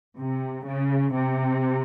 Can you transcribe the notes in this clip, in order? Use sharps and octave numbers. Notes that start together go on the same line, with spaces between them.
C3
C#3
C3